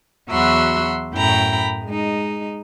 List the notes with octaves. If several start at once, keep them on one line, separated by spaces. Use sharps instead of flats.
E2 F#3 F#4 E5 B5 C6
F#2 A2 E4 G5 A#5 B5
G#3 D#4